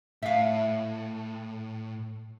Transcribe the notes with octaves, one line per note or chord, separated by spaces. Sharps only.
A2 E5 F5